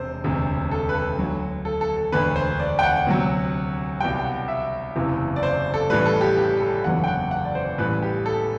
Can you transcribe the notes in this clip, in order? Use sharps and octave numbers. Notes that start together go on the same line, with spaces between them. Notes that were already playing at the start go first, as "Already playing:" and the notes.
Already playing: E1 C3 C5
E1 D2 C3
A4
B4
A4
D2 D3 F#3
A4
A4
A4
E1 D2 D3 B4
C5
D5
G5
F#5
D2 C3 F#3
C2 B2 G3 G5
G5
F#5
E5
F#1 E2 C3 E3
D5
C5
A4
A1 A2 G3 B4
A4
G4
G4
A4
F#1 E2 D3 F#3 F#5
G5
F#5
F#5
D5
C5
A1 A2 G3 B4
G4
A4